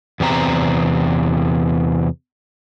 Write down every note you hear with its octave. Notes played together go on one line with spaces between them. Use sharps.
E2 C3 C4 A#5